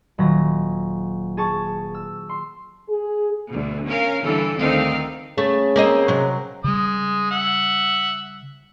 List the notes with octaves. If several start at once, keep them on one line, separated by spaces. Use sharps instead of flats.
D#1 F#3 A#6
G#4 A5 C#6
E6
C6
G#4
D2 B2
C#4 A#4 F5
G2 D3 E3 A4
D2 D#3 C4 D#4 A4 F5
C#3 A3
A#3 C4 D#5
C3 F#3
C#3 G3 G#3 D#6
E5 F#5